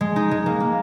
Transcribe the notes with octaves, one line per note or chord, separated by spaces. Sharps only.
G#3
D#4
G#3
A#3
A#3